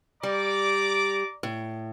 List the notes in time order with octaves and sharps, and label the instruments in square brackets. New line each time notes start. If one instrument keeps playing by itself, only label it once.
[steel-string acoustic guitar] G3 [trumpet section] D5 A#5 D6
[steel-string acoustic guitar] A2